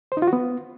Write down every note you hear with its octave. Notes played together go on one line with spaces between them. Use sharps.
C5
D#4
F4
F#4
B3